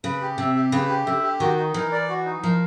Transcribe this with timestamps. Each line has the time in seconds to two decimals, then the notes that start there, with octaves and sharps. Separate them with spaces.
0.04 C#3 B4
0.21 G4
0.38 C3 E5
0.55 G4
0.72 C#3 B4
0.89 G4
1.06 D3 E5
1.23 G4
1.40 D#3 F#4
1.58 D#4
1.74 E3 A#4
1.92 D5
2.09 F#4
2.25 D#4
2.43 F3 A#4